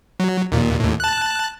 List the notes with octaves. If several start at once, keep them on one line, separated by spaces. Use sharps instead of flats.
F#3
D#2 A#2
D#2 A2
A5 F#6